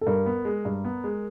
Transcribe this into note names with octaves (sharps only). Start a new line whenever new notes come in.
A4
G2 A#4
B3
G#3
G2
B3
G#3